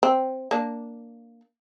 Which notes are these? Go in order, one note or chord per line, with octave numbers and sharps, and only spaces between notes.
C4
A#3 D4